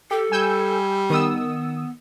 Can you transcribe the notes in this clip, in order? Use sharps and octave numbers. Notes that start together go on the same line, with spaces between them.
G4 A4
G3 G#5 E6 G6
D#3 B3 D#6 E6